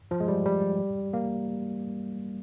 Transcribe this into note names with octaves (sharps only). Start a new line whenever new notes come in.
F3
G#3
G3
G3
A#3